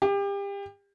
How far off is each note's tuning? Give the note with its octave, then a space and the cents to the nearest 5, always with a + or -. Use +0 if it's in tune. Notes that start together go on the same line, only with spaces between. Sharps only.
G4 +30